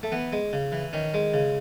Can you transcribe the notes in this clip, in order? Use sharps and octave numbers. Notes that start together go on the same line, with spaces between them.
A3
E3 B3
G#3
C#3
E3
D#3 C#4
G#3
C#3